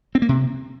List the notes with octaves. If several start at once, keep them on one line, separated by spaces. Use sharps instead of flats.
C4
A#3
C3